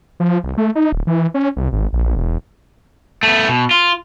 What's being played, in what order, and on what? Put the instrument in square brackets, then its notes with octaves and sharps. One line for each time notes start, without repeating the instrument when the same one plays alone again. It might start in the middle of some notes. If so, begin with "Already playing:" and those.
[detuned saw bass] F3
C2
A3
D#4
D1
E3
C#4
C2
G#1
A#1
E1
[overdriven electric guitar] A3 B3
B2
F4